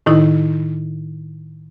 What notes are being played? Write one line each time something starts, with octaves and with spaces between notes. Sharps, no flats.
A2 D#3 D#4 E4